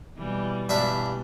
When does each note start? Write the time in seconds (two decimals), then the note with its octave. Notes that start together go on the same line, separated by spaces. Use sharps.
0.18 B2 E3 G3
0.69 G2 B2 E3 D4 E5